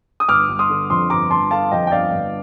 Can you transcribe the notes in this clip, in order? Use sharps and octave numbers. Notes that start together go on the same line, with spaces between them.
D#6
G1 D6 F6
G1
C6 D#6
D3
F2 C6 D#6
G1 A#5 D6
G1 A5 C6
D3 F5 A5
F2 D#5 G5
G5
G1 D5 F5
G1